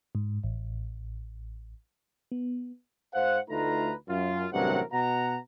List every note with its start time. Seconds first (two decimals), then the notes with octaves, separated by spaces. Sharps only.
0.15 G#2
0.44 A1
2.32 B3
3.14 G#2 C5 F5 F#5
3.50 D2 A3 D#4 F4 B4 A#5
4.09 F#2 F4
4.53 A1 G2 C3 F#3 A#4 F#5
4.93 B2 F#5 A#5